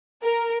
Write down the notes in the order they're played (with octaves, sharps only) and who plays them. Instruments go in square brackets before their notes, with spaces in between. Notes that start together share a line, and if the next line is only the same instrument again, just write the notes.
[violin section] A#4